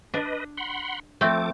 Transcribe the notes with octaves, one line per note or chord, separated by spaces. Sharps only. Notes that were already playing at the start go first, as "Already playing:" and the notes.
D4 B4 D#5
F#5 B5 C6
F3 A3 C4 A4 D6